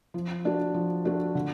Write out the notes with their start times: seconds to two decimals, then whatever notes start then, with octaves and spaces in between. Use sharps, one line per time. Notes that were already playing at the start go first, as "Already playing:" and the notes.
0.14 F3
0.45 A3 D4 F#4
0.74 F3
1.05 A3 D4 F#4
1.35 D3